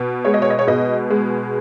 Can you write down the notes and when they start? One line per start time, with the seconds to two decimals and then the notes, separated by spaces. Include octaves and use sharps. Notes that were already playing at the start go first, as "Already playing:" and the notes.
Already playing: B2
0.25 G#3 C#5
0.34 D#5
0.42 C#5
0.50 D#5
0.59 C#5
0.67 B2 D#5
1.10 G#3